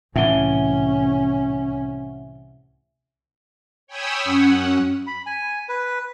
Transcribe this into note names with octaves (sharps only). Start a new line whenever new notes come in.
C2 A2 E3 C#4 E5 F#5 G7
C#5 G5 G#5 B5 D#6 E6
F#2 C#4 F#5
B5
G#5
B4